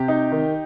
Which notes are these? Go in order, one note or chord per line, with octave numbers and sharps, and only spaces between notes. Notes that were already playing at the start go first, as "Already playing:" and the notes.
Already playing: C3 G4
D#4
D#3